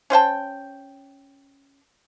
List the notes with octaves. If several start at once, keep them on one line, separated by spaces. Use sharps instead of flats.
C#4 C5 G5 A5